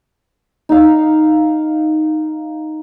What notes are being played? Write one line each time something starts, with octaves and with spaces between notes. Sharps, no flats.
D#4 F5